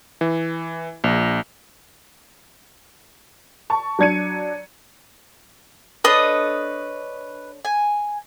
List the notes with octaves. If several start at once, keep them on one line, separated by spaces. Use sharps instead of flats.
E3
A#1
A5 C#6
F#3 D4 G#6 C#7 D#7
D4 A4 B4 C#5 D#5 D#6
G#5